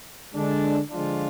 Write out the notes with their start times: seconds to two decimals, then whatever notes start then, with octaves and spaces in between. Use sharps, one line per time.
0.32 D3 G#3 D4
0.91 D3 F3 G#3 D4 F4